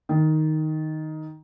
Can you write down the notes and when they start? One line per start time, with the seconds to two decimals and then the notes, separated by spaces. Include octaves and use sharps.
0.09 D#3